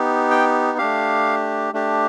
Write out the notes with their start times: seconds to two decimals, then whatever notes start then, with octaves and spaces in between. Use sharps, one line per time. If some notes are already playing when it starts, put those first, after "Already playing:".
Already playing: B3 D#4 G4
0.31 G5
0.78 A3 D4 G4 F5
1.73 A3 D4 G4